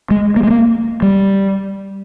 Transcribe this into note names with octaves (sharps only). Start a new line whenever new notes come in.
G#3
A#3
G#3
A#3
G3